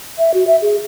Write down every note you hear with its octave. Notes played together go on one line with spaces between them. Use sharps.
E5
F#4
E5
G#4